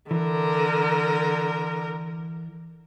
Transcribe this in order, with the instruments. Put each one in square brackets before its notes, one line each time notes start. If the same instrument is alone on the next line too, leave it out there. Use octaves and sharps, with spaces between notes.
[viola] D3 A#4 [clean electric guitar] E3